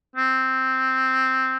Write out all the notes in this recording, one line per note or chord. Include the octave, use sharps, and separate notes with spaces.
C4